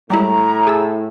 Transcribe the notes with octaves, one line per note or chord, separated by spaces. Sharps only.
A2 G3 G#3 E4 A#5
G#4 A5 E6